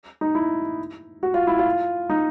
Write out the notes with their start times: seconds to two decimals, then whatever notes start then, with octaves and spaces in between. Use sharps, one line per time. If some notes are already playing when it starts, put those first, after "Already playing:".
0.21 D#4
0.35 E4
1.23 F#4
1.34 F4
1.47 E4
1.59 F4
2.10 D#4